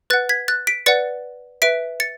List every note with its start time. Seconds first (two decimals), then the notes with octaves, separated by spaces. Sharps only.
0.10 B4 F#5 F#6 A6
0.29 G#6 B6
0.48 F#6 A6
0.67 B6 D7
0.86 B4 D5 F#5 A6 C#7
1.62 B4 E5 B6 D7
2.00 A6 C#7